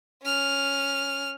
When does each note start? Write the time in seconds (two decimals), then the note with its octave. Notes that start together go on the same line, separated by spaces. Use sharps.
0.22 C#4 F6